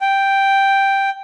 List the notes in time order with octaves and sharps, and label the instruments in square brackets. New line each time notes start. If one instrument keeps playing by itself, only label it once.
[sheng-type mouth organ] G5